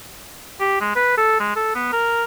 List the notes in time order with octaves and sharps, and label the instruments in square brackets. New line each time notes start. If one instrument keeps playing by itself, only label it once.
[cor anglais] G4
G#3
B4
A4
G#3
A4
B3
A#4